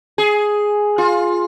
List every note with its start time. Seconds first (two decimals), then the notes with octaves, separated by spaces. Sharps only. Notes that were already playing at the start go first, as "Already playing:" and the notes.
0.18 G#4
0.98 F4